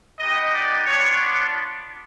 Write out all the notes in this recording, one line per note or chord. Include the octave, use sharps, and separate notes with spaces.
B3 D#4 G4 D#5
D5
B3 D4 F4 C#5
D5